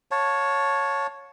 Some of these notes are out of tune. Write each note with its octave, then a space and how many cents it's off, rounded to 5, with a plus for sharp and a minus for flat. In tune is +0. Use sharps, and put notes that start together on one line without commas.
C#5 +0 F5 +35 A5 +0